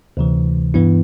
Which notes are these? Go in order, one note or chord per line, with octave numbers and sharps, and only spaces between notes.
D2 C3 E3
G2 E3 B3 E4